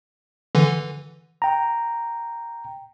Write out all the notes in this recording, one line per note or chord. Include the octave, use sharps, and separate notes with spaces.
D3 E3
G5 A#5